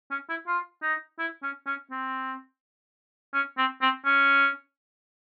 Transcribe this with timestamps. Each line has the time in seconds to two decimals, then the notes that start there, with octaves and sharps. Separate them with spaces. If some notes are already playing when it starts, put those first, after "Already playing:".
0.11 C#4
0.29 E4
0.47 F4
0.83 D#4
1.19 E4
1.43 C#4
1.66 C#4
1.91 C4
3.34 C#4
3.58 C4
3.82 C4
4.05 C#4